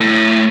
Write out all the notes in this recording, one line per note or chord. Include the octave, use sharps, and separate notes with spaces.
A2